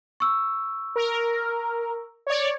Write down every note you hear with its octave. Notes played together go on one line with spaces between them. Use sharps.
C#6 E6
A#4
C#5 D5